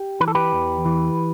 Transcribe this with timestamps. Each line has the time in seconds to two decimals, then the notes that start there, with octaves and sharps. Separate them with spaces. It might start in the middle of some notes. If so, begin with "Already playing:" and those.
Already playing: G4
0.20 E3 B4
0.28 A4
0.35 G4 B4
0.53 E2
0.85 E3